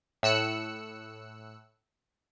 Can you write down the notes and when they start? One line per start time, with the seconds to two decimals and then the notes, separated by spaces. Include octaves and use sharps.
0.23 A2 E6 F#6 C#7